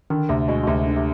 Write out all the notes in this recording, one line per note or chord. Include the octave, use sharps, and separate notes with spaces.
D3 D#3
D2 C3
B2 G#3
B2
D2 C3
D3
C3